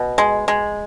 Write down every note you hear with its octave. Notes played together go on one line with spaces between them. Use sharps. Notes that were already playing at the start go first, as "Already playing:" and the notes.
Already playing: B2
G#3
G#3